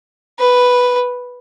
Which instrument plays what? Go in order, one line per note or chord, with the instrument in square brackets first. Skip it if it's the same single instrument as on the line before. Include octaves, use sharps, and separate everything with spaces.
[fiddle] B4